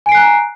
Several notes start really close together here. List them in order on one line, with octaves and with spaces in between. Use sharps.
G#5 D7 C7 F#6 A#5